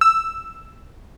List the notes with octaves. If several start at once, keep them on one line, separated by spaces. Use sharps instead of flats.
E6